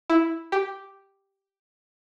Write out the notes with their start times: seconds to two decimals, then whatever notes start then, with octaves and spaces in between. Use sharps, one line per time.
0.10 E4
0.52 G4